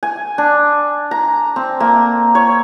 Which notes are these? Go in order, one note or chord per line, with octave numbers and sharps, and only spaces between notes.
G#5
D4
A#5
C4
A#3
C#5